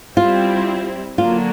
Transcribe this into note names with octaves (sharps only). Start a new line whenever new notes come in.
G3 C4 E4 F4
D3 F#3 A#3 D4 F4